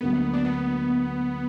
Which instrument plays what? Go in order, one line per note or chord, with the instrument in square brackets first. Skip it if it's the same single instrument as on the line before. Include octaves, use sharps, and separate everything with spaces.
[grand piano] D2 D3 F#3 A#3 [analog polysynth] B3
[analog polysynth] D4
B3